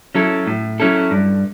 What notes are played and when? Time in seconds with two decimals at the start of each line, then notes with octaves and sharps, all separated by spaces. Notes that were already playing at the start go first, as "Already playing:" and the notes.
0.15 F#3 C#4 E4 A4
0.47 A2
0.80 F#3 C#4 E4 A4
1.11 G2